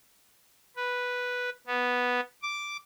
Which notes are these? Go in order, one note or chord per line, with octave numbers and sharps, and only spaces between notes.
B4
B3
D6